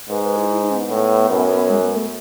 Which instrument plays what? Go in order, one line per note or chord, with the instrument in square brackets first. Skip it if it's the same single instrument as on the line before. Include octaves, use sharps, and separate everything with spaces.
[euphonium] G#2 [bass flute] B4
[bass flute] B4
E4
E4
D#4
C#4
B3
[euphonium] A2
F#2
[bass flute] G#3
B3
A3